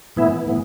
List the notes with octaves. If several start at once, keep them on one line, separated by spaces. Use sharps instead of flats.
A2 E3 B3 E4
A2 E3 B3